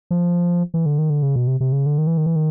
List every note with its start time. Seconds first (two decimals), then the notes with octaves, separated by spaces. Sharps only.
0.11 F3
0.74 E3
0.86 D3
0.98 D#3
1.10 D3
1.22 C#3
1.36 B2
1.47 C3
1.60 C3
1.72 C#3
1.86 D3
1.98 D#3
2.07 E3
2.17 D#3
2.26 E3
2.36 D#3